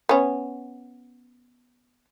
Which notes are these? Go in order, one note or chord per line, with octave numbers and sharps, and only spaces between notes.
B3 C#4